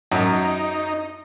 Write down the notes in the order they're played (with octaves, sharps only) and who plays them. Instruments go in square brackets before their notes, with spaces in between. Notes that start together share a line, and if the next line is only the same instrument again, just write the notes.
[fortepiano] F#2 [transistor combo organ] D#4